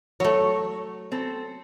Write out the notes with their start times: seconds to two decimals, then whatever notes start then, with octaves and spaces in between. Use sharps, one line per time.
0.20 F#3 A3 C#5
1.12 C4 A4